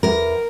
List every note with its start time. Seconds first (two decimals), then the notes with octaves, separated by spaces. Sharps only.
0.03 E2 A#4